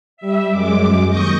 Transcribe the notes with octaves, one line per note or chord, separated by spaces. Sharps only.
G3 E5
F#2 G#3 D6
D#2 C#6 D#6 G6 A#6 C#7